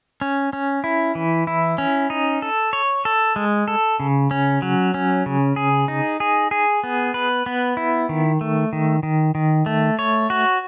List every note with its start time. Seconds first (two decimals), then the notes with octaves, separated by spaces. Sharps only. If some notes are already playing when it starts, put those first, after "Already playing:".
0.21 C#4
0.53 C#4
0.84 E4
1.15 E3
1.47 E4
1.78 C#4
2.10 D#4
2.42 A4
2.73 C#5
3.05 A4
3.36 G#3
3.68 A4
4.00 C#3
4.31 C#4
4.62 F#3
4.94 C#4
5.26 C#3
5.56 G#4
5.88 D#4
6.20 G#4
6.51 G#4
6.84 B3
7.14 B4
7.46 B3
7.77 E4
8.09 D#3
8.41 A3
8.73 D#3
9.03 D#3
9.35 D#3
9.66 A3
9.99 C#5
10.30 F#4